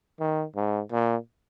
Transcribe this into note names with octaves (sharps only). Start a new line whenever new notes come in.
D#3
G#2
A#2